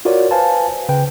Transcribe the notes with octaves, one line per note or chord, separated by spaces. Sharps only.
F4 F#4 A#4 C#5 D5
B4 C5 F5 G#5 A5
C#3 B4 G5